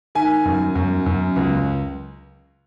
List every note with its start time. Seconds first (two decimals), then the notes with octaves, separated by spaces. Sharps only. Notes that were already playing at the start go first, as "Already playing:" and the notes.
0.15 D#3 G#5
0.45 F#2
0.75 F#2
1.06 F#2
1.36 C#2